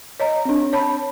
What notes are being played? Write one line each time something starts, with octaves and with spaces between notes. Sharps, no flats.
C#5 D#5 A#5
C4 D4
C#5 A5 B5